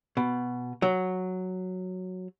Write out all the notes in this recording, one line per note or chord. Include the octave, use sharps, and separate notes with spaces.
B2
F#3